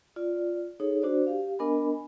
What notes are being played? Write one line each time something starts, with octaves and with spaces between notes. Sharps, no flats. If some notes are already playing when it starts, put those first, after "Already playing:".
F4 D5
D#4 G#4 A4 C#5
D4 F#4 C5 D5
G4 F5
B3 D4 A#4 D#5 G#5 B5